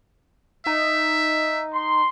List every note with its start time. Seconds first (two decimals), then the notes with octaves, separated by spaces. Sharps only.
0.66 D#4 E5
1.73 C6